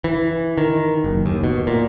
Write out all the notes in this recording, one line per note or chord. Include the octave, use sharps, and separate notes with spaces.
E3
D#3
F#1
D#2
B2
A#2